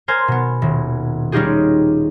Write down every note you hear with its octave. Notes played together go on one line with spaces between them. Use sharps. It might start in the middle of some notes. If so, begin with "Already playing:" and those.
A#4 C5 G#5 F6 G#6
B2 B3
D#1
G3 C#4 D#4 F4 G4 G#4